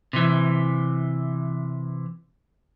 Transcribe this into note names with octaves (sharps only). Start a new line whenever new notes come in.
C3 E3